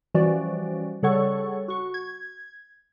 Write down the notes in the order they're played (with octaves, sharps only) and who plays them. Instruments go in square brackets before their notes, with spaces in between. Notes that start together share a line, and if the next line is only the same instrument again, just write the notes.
[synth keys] E3 F3 G3 C#4 F#4 D5
C#3 G3 A4 C#5 F#5 C#6
F#4 C#6
G#6